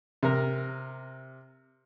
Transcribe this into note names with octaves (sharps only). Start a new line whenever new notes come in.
C3 A#4